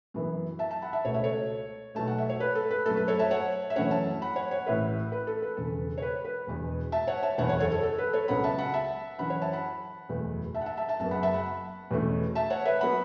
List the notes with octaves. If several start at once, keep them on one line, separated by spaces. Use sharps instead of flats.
F#2 E3 B3
E5 A5
E5 A5
F#5 B5
E5 A5
C#2 B2 A3 C#5
E5
A4 C#5
B1 B2 A3 A5
F#5
E5
C#5
B4
A4
B4
F#2 F#3 A3 A4
B4
A4 C#5
E5 A5
C#5 F#5
E5
F#2 E3 A3 C#4 C#5 F#5
E5 A5
F#5 B5
C#5 F#5
C#5 F#5
A1 A2 E3 B4 E5
B4
A4
B4
E1 E2 C#3 A4
C#5
B4
B4
E1 E2 B2
E5 A5
C#5 F#5
E5 A5
F#1 E2 E3 C#5 F#5
C#5 F#5
A4 C#5
A4
A4
B4
A4 C#5
C#2 C#3 F#3 B3 F#5 B5
E5 A5
F#5 B5
E5 A5
F#2 E3 C#4 F#5 B5
C#5 F#5
E5 A5
F#5 B5
F#1 E2 B2 A3
E5 A5
F#5
E5 A5
E5 A5
E5 A5
F#1 F#2 F#3 B3 E5 A5
F#5 B5
E5 A5
F#5 B5
E2 B2 A3 C#4
E5 A5
C#5 F#5
B4 E5
F#3 B3 F#5 B5